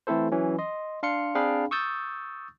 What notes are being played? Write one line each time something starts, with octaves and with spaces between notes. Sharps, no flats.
E3 A3 C4 E4 A4 C5
E3 F#3 C#4
D#5 C6
D4 F5 C6 C#7
C4 D4 G#4 F5 G5 B5
C#6 D#6 E6 G6 A6